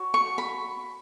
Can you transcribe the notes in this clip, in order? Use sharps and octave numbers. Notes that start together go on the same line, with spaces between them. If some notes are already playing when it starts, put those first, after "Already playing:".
Already playing: F#4 C#5
C#6
B5